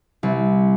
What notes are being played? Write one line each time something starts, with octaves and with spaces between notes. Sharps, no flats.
C2